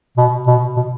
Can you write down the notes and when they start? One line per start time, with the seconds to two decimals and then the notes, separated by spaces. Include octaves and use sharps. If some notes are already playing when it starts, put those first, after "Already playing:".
0.17 B2
0.47 B2
0.77 B2